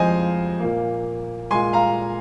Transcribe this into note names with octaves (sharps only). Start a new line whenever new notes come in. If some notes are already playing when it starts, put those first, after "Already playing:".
Already playing: F2 F3 G#3 C5 D#5 F5 G#5
A#2 A#3
A#2 G#3 G#5 C6
F5 A#5